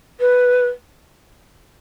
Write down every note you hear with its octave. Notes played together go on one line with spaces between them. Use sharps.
B4